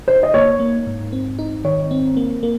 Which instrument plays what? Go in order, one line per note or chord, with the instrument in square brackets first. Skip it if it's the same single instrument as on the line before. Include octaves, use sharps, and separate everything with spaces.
[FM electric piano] D#4 [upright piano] C5
[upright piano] D#5
[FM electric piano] A#3 [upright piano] C#5
[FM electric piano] A#3
G#2
C4
D#4
[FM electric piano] D#3 [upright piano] C#5
[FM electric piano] C4
A#3
A#3